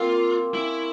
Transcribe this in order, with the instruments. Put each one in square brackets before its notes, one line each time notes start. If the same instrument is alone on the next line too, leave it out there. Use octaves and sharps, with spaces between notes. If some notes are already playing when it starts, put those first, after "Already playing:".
Already playing: [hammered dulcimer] A#3 C4 [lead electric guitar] F4
[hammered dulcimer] C#4 [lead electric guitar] E4